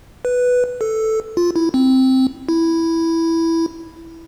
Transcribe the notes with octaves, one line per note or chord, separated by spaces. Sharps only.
B4
A4
F4
E4
C4
E4